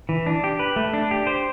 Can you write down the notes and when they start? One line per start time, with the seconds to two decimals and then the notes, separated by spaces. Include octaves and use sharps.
0.09 E3
0.26 D4
0.44 G4
0.59 B4
0.76 A3
0.94 D4
1.11 G4
1.27 C5